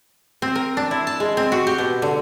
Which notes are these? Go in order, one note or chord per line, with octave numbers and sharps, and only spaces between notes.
C4
A#4
D4
E4
A5
G#3
C4
F#4
G4
B2
D3